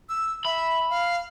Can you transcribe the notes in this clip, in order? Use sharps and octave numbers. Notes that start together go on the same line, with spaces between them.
E6
E5 B5
F5